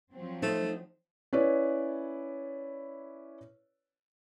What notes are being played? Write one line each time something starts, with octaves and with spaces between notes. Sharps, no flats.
F3 F#3 C4
A3 D#4 C5 D#5
C#4 E4 B4 C#5 D5